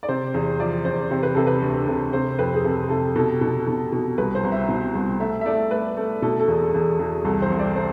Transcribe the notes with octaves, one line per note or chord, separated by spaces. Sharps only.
D5
C3 C5
E2
F3 D5
E2 C5
C3 C5
B4
C3 A4
B4
D2
C3
C3 C5
F2 B4
G#4
C3 A4
C3 A4
B2 A4
B2
B2
B2
C2 B4
C5
C2
E5
B2
C2
A3 E5
E5
A3 D5
A3 B4
A3
B2 A4
A4
E2
E2
E2
C2 A4
C5
C2
D5
C5